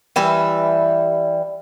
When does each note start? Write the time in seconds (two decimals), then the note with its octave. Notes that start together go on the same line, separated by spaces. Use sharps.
0.16 E3 G3 B4 E5